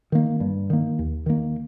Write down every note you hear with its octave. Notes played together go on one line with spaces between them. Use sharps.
D#3 A#3
G2
D#3 A#3
D#2
D#3 A#3